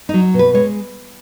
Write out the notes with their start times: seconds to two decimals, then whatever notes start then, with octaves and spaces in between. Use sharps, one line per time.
0.09 F#3 D#4
0.34 B2
0.39 B4
0.54 G#3 C#5